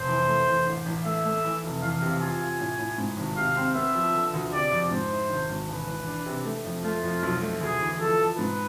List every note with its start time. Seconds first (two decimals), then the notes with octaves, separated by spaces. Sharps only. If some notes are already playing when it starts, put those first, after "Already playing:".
Already playing: F1 C5
0.09 E3
0.28 A3
0.48 E2
0.67 A1
0.86 A1
1.05 A3 E5
1.25 A3
1.44 E3
1.64 F1
1.82 E2 F5
2.02 C3
2.21 F4 G#5
2.41 F4
2.60 A2
2.79 A2
2.98 G#2
3.17 G#1
3.37 C3 F5
3.57 C4
3.75 B3 E5
3.95 F3
4.14 D3
4.33 D2
4.53 C3 D5
4.72 F2
4.91 G#2 C5
5.11 E4
5.30 G#1
5.49 G#1
5.68 E1 B4
5.88 E2
6.07 D4
6.26 C3
6.45 A3
6.65 F2
6.84 A3 F4
7.03 F2
7.23 B1
7.42 A3
7.61 D2 G#4
7.80 E3
7.99 F3 A4
8.19 F3
8.38 G#2 B4